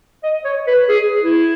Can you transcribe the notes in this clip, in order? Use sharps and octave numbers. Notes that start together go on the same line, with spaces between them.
D#5
C#5
B4
G#4
E4